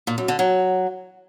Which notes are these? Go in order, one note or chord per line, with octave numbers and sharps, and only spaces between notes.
A#2
F#2
D3
F#3